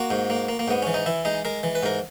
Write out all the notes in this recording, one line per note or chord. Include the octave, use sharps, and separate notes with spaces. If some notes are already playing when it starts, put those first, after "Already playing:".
Already playing: A#3 F#4
G#2
A#3
A#3
A#3
G#2 B3
E3 C#4
D#4
E3 E4
G#3 D#4
G#3 A#4
E3
B4
G#2 A#4